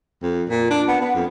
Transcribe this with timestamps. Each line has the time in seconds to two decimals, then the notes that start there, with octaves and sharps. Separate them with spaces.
0.22 F2
0.49 A#2
0.71 D4
0.88 B3
1.01 B3
1.15 F2